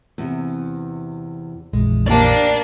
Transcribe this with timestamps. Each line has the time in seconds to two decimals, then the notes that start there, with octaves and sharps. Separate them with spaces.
0.18 E2 C3
1.73 A#1 F2 E3 G#3
2.08 A#3 D4 G4 C5 D5 A5